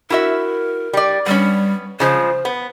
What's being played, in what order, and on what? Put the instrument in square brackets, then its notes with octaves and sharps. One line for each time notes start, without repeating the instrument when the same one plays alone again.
[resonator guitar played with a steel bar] E4 F#4 E5 [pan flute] A#4
[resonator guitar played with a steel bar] G3 D5
[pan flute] G3 [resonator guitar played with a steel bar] B3 C#4
[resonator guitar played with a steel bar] C#3 F3 G#3 [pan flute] C5
[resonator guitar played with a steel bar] B3